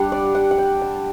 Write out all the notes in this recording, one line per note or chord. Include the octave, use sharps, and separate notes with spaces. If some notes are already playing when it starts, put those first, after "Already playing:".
Already playing: G3 D4 F#5
D5
F#5
F#5
G5
A5